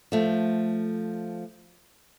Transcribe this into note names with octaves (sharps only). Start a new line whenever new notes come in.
F3 A3